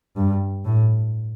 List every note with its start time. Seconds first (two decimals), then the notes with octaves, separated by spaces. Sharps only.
0.16 G2
0.65 A2